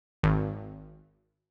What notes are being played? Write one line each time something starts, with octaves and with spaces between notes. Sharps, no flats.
G#1